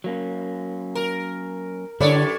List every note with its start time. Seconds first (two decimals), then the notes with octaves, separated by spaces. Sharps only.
0.04 F#3 A#3 C#4
0.95 A#4
2.01 F#2 D3 E4 C#5 D5